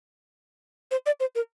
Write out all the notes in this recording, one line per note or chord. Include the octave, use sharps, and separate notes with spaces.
C5
D5
C5
A#4